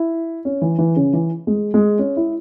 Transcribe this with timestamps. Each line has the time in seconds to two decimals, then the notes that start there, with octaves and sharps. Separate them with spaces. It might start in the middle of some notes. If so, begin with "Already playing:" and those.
Already playing: E4
0.45 C#4
0.62 E3
0.78 E3
0.96 C#3
1.13 E3
1.47 G#3
1.74 G#3
1.99 C#4
2.17 E4